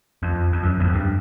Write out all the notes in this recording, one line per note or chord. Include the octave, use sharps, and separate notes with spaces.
F2
F2
F#2
E2
F2
G2